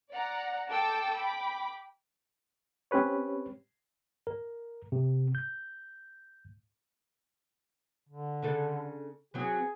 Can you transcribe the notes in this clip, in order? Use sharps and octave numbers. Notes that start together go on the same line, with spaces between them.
D5 F#5 A#5
A4 G5 A5 D6 E6
G5 B5 D6
C4 C#4 G4 B4 C#5
A#4
C3
G6
D3
C#3 D4 A4
E3 F#3 C4 G#4